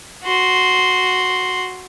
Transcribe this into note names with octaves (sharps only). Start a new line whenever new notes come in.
F#4 C6